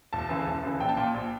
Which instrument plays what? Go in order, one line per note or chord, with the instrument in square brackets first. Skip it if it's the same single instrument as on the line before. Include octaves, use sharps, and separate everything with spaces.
[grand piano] E1 A5
D2 C#3 E3
E1
D2 C#3 E3
A#1 G5
A5
A#2 G5
A#1